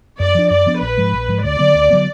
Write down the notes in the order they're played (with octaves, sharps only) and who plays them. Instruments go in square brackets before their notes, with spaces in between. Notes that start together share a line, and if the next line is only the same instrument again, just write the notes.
[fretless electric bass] F#2 [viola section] D5
[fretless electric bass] F3 B3 D4
[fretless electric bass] F#2 [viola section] D5
[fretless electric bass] F3 B3 D4
[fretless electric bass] A#1 [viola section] B4
[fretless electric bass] G#2 F3 G#3
A#1
G#2 F3 G#3
[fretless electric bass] D2 [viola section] D5
[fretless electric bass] D3 F#3 B3
D2
D3 F#3 B3